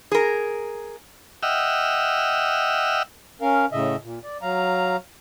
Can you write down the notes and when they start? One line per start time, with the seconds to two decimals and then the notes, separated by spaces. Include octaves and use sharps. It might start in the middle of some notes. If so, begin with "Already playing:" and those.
0.12 G#4 A#4
1.43 D#5 E5 F#5 G5 E6 F6
3.41 C#4 A#4 F5
3.72 A2 C#3 D#5 E5
4.03 A#2
4.23 D5
4.42 F#3 F5 A#5